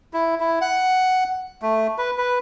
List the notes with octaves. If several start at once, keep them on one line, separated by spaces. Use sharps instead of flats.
E4
E4
F#5
A3
B4
B4